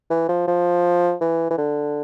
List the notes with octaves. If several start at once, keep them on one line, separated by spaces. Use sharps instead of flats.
E3
F3
F3
E3
E3
D3